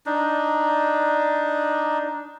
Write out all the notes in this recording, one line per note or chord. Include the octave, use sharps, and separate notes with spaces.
D4 D#4